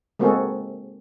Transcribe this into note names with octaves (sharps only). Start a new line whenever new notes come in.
G#3 A#3 C4 F#4 G#4 A4